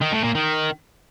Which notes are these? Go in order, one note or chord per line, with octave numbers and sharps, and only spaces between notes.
D#3
A2
A#2
D#3